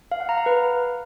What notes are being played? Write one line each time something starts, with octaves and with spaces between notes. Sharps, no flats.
F5
F#5
A#5
F5
B4